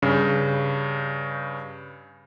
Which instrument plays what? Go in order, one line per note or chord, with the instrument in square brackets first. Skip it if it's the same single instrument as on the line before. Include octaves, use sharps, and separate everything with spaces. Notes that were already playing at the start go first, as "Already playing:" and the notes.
[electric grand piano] G2 C#3